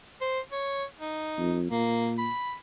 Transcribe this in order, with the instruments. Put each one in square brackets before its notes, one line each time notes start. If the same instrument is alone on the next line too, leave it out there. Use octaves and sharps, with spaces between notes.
[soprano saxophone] C5
C#5
D#4
[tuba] F2
[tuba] A#2 [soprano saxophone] A#3
[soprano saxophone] B5